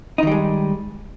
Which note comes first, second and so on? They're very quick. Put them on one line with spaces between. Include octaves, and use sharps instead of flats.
D#4 D#3 G3 G#3